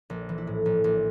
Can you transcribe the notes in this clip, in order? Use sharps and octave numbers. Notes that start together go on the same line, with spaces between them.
A#1
E3
E4
A2
A#1
A#1